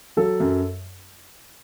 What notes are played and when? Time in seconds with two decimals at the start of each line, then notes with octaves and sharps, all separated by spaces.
0.17 F#3 A4
0.40 F#2